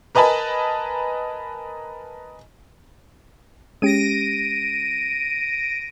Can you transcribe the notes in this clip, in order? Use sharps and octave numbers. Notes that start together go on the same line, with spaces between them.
A#4 B4 D#5 G#5 A5 B5
G#3 C#4 G4 A#6 D7 D#7